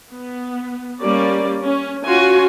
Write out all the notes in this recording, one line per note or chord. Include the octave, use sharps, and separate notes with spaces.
B3
G3 A#3 C#4 D5
C#4
C#4 F4 F#4 G#5